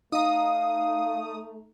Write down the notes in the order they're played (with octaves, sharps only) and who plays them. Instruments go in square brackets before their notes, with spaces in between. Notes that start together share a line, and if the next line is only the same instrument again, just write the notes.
[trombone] A3 [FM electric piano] D#4 A#5 [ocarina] F5 [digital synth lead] D#6